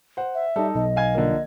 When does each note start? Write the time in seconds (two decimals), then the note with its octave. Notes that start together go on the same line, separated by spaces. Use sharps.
0.17 C5 F#5
0.34 E5
0.56 G3 D#4 A4
0.75 B1 D#5
0.96 F5 G#5 G#6
1.15 D3 F3 A#3